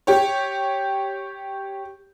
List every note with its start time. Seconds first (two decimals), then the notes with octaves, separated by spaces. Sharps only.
0.07 G4 C#5